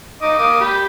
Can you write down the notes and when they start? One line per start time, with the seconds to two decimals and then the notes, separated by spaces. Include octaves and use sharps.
0.22 D#4 D#5 D6
0.39 A#3 D6 D#6
0.60 G4 B5